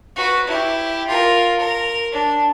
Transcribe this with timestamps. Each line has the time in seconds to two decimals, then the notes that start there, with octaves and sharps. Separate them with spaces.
0.17 F#4 B4
0.48 E4 G4
1.08 F4 A#4
1.59 A#4
2.12 D4